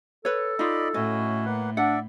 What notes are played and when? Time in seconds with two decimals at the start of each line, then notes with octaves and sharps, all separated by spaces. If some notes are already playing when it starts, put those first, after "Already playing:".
0.25 A4 B4 C#5
0.59 D#4 F4 D5 D#5 B5
0.94 A2 C#4 E4 F#4 D#5
1.46 A#3 B4 F#5
1.77 D4 D5 E5 F#5